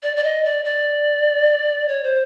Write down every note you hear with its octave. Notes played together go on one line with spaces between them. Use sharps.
D5
D5
D#5
D5
D5
C#5
C5